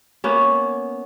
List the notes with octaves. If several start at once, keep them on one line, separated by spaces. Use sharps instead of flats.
A#3 B3 C#4